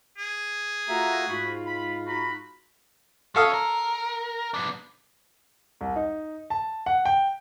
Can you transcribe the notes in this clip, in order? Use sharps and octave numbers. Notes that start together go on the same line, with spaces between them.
G#4
A3 F4 F#4 E5 A#5
G#2 F4 F#4 B5
B5
D#4 F#4 B5
C#4 A4 F5 D#6
A#4
B3 D4
C2
D#4
A5
F#5
G5